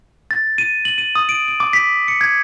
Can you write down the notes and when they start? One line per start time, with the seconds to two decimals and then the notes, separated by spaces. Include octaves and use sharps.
0.31 A6
0.58 D#7
0.85 F#7
0.98 D#7
1.15 D#6
1.29 D7
1.48 D7
1.60 D6
1.73 B6
2.08 C#7
2.21 G#6